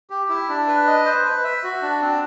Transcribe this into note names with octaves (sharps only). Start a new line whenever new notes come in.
G4
E4
D4
B4
D#5
C5
B4
E5
F#4
D4
C4